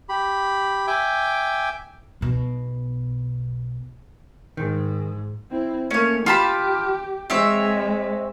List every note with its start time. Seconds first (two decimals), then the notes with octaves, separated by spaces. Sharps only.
0.09 G4 B5
0.87 E5 G5 G#5 D6
2.21 B1 B2
4.57 G#2 D#3
5.51 C4 E4
5.91 A3 A#3 C#4 C#5
6.26 F4 G4 A5 B5
7.30 G#3 C4 C#5 E5